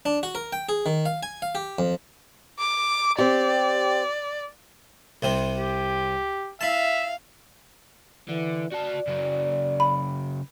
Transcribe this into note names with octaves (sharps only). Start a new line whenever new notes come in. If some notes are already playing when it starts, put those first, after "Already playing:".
D4
F#4
A#4
G5
G#4
D#3
F5
G#5
F5
G4
F2
D6
C4 G4 D5
C2 C3 C4
G4
E4 E5 F5 A5
D3 E3
F#4 D5 A5
C#3 F#3
B5